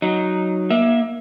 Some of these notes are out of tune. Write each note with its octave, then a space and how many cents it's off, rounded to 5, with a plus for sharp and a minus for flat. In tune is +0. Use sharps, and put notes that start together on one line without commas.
F#3 +0 D#4 +0
A#3 +30 E5 +0